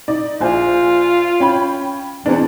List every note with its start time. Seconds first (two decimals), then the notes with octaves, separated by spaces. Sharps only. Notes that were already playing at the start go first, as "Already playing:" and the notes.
0.08 D#4 D5
0.41 A#1 F4 C5 G#5
1.40 C#4 G5 B5
2.26 E2 C4 D4